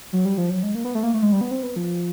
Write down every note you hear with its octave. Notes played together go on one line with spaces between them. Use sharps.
F#3
G3
F3
F#3
G#3
A#3
B3
A3
A#3
A3
G#3
G3
B3
C4
B3
F3